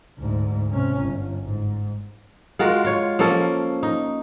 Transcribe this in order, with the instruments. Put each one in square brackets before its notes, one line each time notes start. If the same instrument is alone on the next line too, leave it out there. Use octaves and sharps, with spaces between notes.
[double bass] D2 G#2
C3 C#4
G1
G#2
[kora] G#3 F4 F#4 A#4
F4 C#5
F3 A#3 C#4 A4
D#4